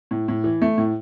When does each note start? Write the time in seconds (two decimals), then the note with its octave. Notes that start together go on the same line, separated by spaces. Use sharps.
0.11 A2
0.28 A2
0.44 E3
0.62 A3
0.78 A2